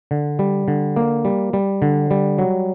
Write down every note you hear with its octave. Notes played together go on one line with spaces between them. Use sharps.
D3
G3
D3
A#3
G3
G3
D3
G3
F#3